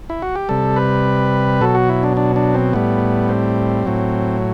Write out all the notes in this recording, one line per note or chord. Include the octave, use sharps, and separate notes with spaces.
E4
F#4
G4
C3 G3 A4
B4
B2 F#3 A4
F#4
E4
D4
D4
D4
C4
A2 G3 B3
C4
A2 F#3